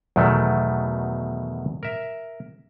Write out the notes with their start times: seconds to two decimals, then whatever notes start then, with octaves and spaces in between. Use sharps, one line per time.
0.16 E2 B2 D#3 F#3 A3
1.83 A#4 E5